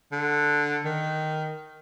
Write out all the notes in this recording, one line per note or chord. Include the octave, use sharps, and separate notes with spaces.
D3
D#3